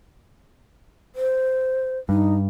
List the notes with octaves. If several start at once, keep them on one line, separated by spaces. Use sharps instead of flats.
C5
G2 D#4